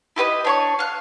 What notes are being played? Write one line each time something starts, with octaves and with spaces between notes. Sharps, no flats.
E4 G4 B4 D#5
D4 C#5 C#6
F5 F#6